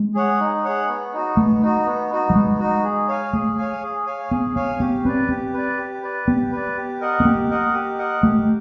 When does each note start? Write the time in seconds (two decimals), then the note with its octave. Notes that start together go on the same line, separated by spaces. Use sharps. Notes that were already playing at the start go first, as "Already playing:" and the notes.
Already playing: G#3
0.14 G#4 C#5 F#5
0.40 D#4
0.65 G#4 C#5 F#5
0.89 B3
1.13 D#4 F#4
1.37 A3 B3
1.62 D#4 F#4
1.86 B3
2.11 D#4 F#4
2.30 G3
2.35 G#3 B3
2.59 D#4 F#4
2.84 G#4
3.08 C#5 F5 G#5
3.33 A3 G#4
3.58 C#5 F5 G#5
3.83 G#4
4.06 C#5 F5 G#5
4.31 B3 G#4
4.55 B3 C#5 F5 G#5
4.80 B3 G4
5.05 C4 B4 D5
5.29 C4 G4
5.54 B4 D5
5.78 G4
6.03 B4 D5
6.27 B3 G4
6.52 B4 D5
6.77 G4
7.00 A#4 D#5 F#5
7.20 B3
7.25 A#3 G4
7.50 A#4 D#5 F#5
7.74 G4
7.98 A#4 D#5 F#5
8.23 A3 G4